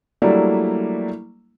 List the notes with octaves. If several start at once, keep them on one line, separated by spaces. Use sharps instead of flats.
F#3 G3 A3 A#3 D4 E4